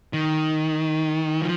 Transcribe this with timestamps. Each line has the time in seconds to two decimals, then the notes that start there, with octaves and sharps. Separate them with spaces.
0.13 D#3
1.41 F3